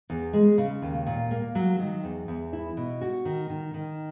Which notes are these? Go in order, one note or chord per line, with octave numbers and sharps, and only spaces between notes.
E2
G#3
C#3
D#2
A#2
A#3
F#3
D#3
E2
E2
E4
B2
F#4
D#3
D#3
D#3